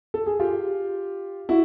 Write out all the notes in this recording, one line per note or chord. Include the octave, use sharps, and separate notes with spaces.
A4
G#4
F4 G4
E4 F#4